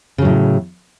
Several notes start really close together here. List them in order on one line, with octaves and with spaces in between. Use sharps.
C#3 F#3 A2